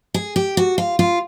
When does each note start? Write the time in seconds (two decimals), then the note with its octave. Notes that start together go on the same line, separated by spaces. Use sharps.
0.14 G#4
0.36 G4
0.57 F#4
0.78 F4
0.99 F4